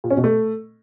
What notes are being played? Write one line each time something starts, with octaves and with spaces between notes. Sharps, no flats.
A#2
C#4
B2
A3